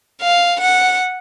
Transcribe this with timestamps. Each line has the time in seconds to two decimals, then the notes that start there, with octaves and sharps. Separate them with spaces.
0.21 F5
0.61 F#5